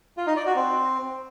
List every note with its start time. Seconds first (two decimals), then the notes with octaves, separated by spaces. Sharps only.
0.17 F4
0.27 D#4
0.36 D5
0.46 F#4
0.56 C4